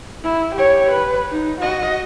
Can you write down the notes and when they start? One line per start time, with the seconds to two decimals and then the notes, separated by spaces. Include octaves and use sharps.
0.24 E4
0.56 G4 C#5
0.91 B4
1.31 D#4
1.62 F#4 D#5